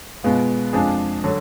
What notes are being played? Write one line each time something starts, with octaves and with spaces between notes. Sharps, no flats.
B2 G#3 B3 F4
F2 F3 G#3 D4 G#4
D3 F#3